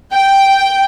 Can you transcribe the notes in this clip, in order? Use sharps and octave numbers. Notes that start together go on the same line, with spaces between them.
G5